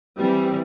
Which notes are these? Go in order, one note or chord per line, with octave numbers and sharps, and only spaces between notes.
E3 G3 C4